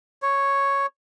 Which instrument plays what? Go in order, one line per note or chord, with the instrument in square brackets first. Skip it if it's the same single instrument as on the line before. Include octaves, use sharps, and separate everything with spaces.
[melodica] C#5